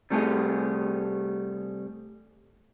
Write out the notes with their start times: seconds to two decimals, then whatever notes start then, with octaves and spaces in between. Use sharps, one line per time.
0.10 C3 G3 A3 G4 G#4